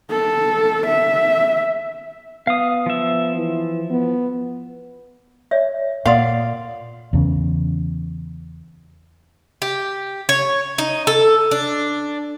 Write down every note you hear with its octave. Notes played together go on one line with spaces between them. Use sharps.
A4
E5
B3 F5 D#6
F3 E5
E3
B3
C#5 D5 E5
A#2 A#3 D5 F5 F#5 C6 D#6
E2 C#3
G4
C#5
D#4
A4
D4